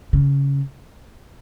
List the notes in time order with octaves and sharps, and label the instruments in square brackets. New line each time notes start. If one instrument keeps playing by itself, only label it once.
[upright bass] C#3